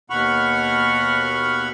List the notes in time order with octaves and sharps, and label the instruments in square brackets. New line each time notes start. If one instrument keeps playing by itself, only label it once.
[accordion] D#2 B2 F#5 B5 C#6 F6